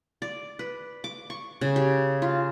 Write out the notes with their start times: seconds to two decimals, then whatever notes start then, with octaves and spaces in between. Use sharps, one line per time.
0.22 D5
0.59 B4
1.04 D6
1.30 C#6
1.61 C#3
1.76 G4
2.22 F4